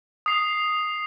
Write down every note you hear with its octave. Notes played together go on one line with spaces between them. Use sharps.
D#6 C7